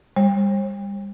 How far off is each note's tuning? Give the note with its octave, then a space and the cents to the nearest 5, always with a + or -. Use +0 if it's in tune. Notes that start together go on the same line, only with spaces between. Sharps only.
G3 +35 C5 +45